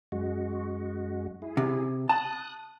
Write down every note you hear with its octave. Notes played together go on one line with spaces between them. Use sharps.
F#2 G#3 F#4
E4 G#4
C3
A5 D#6 F#6